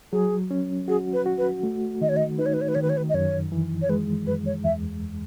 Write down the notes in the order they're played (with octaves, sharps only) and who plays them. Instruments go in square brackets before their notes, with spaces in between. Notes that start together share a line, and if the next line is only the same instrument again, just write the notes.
[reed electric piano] F#3 [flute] G#4
[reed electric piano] C#4
[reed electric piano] F#4 [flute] G#4
[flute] B4
[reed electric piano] F#4
[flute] B4
[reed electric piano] A3
[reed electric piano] D#3 [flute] D#5
[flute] C#5
D#5
[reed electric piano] D#4 [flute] B4
[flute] C#5
B4
C#5
B4
[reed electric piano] D#3 [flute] C#5
[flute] B4
C#5
B4
D#5
[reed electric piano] F#2 [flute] C#5
[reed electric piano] E3
[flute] C#5
[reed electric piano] G#3 [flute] B4
[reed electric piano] F#2 [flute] B4
[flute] C#5
[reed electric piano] E2 [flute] E5